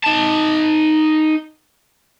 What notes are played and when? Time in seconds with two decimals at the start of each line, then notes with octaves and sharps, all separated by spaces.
0.04 D#4 A5